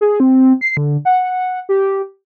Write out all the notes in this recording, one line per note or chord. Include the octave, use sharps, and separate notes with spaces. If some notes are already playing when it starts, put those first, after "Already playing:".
G#4
C4
C7
D3
F#5
G4